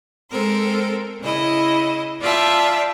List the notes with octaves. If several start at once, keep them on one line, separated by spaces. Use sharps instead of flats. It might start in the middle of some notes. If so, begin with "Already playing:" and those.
G#3 C4 A4 A#4 C5
C#3 E4 D#5
F4 D5 E5 G5 A5